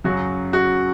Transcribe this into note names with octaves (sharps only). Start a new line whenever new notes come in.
F#2 C#3 F#3 F#4
F#4